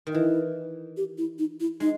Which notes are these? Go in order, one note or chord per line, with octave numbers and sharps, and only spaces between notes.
D#3
E3 E4
G4
E4
D#4
E4
G#3 D#4